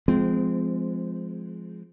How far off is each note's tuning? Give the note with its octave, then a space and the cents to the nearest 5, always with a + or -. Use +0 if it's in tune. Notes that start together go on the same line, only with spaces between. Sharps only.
F3 +0 G#3 +10 C4 -20